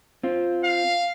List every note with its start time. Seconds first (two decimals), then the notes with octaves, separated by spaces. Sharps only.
0.23 C4 F4
0.64 F5